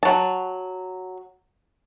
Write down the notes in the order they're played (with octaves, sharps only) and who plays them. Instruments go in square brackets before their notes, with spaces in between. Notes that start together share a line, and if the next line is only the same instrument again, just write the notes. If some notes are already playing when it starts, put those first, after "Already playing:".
[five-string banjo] F#3 A5